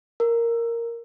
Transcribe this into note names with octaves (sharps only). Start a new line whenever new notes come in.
A#4